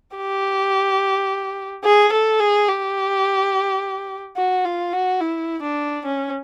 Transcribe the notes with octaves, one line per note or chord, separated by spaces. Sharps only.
G4
G#4
A4
G#4
G4
F#4
F4
F#4
E4
D4
C#4